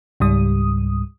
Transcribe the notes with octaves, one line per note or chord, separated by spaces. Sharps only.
C#2 G#2 G3 D#6